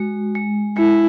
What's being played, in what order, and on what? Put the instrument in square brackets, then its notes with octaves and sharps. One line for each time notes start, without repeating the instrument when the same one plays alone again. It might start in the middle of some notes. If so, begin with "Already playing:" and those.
Already playing: [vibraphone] G#3 F#4
G#3
[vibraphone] G#3 [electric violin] E4